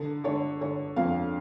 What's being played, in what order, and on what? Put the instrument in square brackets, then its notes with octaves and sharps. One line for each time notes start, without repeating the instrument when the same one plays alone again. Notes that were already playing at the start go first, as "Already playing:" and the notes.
Already playing: [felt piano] D3
D3 C#5
D3 C#5
F2 F5